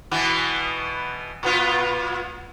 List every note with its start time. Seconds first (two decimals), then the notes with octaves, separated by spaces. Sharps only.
0.11 B2 E3 B3
1.43 A#2 B3 F4